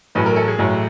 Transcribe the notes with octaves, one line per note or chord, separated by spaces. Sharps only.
A1 A2 F#3 A3 B4
A#4
A4
G#4
A1 A2 F#3 A3